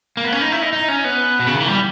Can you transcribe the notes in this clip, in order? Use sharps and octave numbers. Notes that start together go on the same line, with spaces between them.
A#3
B3
C#4
D#4
E4
D#4
D#4
C#4
B3
B2
C#3
D#3
E3
G3